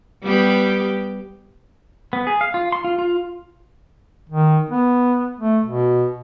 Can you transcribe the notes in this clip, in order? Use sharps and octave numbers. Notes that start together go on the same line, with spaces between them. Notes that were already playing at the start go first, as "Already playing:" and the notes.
G3 B3 G4
B3
G#4
F5
F4
C6
F4
F4
D#3
B3
A3
B2